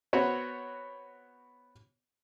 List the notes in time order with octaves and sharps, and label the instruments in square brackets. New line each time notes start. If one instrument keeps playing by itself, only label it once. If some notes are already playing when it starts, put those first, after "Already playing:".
[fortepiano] B3 C4 F#4 C#5